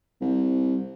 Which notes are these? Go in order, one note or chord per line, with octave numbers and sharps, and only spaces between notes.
C2